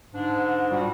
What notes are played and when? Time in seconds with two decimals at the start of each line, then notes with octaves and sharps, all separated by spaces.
0.14 G#2 D3 D4
0.71 A#2 G3 F4 F#4